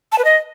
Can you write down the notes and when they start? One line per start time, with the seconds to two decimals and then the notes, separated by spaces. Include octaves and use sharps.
0.12 A5
0.18 B4
0.24 D#5